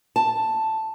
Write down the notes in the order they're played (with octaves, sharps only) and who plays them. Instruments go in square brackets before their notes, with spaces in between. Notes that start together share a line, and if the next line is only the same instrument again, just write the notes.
[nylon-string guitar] A5